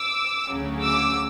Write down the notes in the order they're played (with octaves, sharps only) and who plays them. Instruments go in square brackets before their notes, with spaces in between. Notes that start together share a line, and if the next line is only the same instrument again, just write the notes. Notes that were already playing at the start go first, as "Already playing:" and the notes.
Already playing: [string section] D6 E6
D2 C#3 F#3
D6 E6